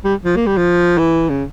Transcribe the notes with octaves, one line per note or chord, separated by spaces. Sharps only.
G3
F3
A#3
G3
F3
E3
C#3